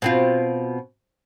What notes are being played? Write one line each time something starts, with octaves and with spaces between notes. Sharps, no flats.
B2 C4 F4